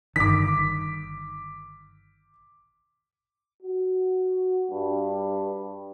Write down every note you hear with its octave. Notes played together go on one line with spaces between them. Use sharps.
G1 D#3 D6 B6
F#4
G2